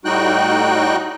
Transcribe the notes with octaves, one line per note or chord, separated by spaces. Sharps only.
A2 G3 D#4 F#4 G5 F#6